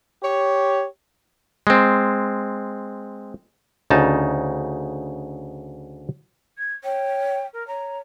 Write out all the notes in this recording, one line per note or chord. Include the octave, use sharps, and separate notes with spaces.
G4 C#5
G#3 C4
D2 C#3 D#4 A5
G#6
C#5 G5
A#4
C#5 A#5